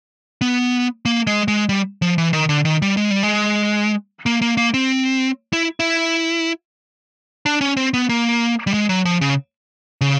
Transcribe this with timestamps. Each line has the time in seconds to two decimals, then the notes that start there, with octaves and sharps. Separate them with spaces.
0.41 B3
1.05 A#3
1.27 G#3
1.48 G#3
1.69 G3
2.02 F3
2.18 E3
2.33 D#3
2.49 D3
2.65 D#3
2.82 G3
2.97 G#3
3.11 G3
3.23 G#3
4.26 A#3
4.42 A#3
4.57 A#3
4.74 C4
5.53 E4
5.80 E4
7.46 D4
7.61 C#4
7.77 C4
7.94 B3
8.09 A#3
8.67 G3
8.74 G#3
8.89 F#3
9.05 F3
9.21 C#3
10.01 C#3